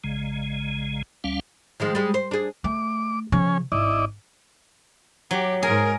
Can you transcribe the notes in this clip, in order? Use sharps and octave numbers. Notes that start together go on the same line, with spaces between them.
A#1 C#3 G#3
D2 G3 C#4 F5
D#3 F3 G#3
G3 G#3
C5
D4 G#4
A3 D6
C#3 F3 C#4 G#5
G#1 E4 D5 D#5
F#3 G4
G#2 G#4 A#4